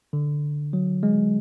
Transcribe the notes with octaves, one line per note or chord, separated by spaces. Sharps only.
D3
F#3
G#3